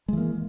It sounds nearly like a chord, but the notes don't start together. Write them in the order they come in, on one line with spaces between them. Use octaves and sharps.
G#3 E3 A#3